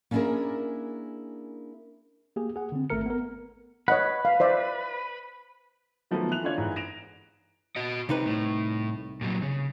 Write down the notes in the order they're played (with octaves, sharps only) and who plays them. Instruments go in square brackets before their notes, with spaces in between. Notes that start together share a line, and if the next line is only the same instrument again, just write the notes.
[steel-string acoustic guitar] A#3 C#4 D4 E4 G#4 A#4
[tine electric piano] A#3 G4 G#4
G#4 F#5
D3 C4
G#1 A3 A4 A#4 C#7
B3 A#4
[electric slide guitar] B4 [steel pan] C#5 D#5 F#5
[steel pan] F5
C5 D5 E5
[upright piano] D#3 F3 F#3 A3 B3
E3 F#6 F7
D3 F4 C#5 D5 G#6
G#2 E3
A#6 D7 E7 F7
[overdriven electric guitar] F#4 D#5
[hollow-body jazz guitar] C2 D#4 B4 [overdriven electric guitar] C3
[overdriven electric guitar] A2
A#2 F#3
C#3